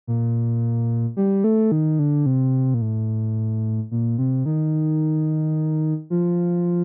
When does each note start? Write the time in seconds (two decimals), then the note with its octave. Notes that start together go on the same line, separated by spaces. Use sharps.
0.07 A#2
1.17 G3
1.44 A3
1.72 D#3
1.99 D3
2.26 C3
2.74 A#2
2.81 A2
3.91 A#2
4.18 C3
4.46 D#3
6.10 F3